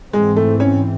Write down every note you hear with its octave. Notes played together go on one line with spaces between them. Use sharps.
G#2 E3 G#3 C4
A3
C#4